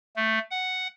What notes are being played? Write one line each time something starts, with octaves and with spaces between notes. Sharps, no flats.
A3
F#5